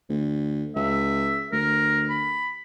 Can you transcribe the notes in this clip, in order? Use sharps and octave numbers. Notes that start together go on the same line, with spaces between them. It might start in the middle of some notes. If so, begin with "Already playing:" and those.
D2
C#2 E5
D2 A#4
B5